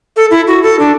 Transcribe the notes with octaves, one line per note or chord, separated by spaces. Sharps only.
A4
E4
F#4
A4
D4